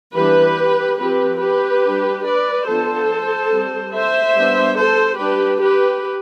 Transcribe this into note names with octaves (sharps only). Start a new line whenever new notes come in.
E3 G3 B3 D4 G4 B4
F3 C4 G4 B4
G4 B4
G3 D4
B4 D5
F3 B3 D4 A4 C5
G3 C4
C5 E5
G3 B3 D4
A4 C5
G3 D4 G4 B4
G4 B4